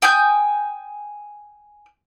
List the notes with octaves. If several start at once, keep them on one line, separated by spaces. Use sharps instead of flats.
G5 G#5 D#6 G6